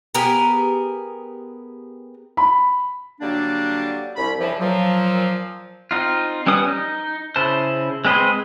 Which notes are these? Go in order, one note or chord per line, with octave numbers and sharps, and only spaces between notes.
B3 G4 G#4 A#4
B5
D3 F#3 G3 A#3 D4
C2 B5
G2 C#3 E3 F3
A#2 F3 F#3
C4 D#4 F4
G3 C#4 B4 D#6
D#4
C#3 E4 C5 A5
G#3 C4 B4 D#5 C6